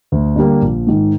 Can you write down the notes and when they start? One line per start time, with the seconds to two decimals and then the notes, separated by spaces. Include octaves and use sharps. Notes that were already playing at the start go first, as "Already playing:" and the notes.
0.12 D2
0.36 D3 G3 A#3
0.62 A#1
0.87 G#2 D#3